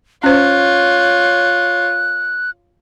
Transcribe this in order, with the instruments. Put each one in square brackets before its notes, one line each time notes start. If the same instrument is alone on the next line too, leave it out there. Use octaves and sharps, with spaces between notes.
[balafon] C#4 C5 [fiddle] F4 C#5 [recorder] F#6